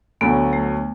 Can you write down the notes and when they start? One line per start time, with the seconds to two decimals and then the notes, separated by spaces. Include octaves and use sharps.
0.21 D2 D3 F#3 B3
0.53 A3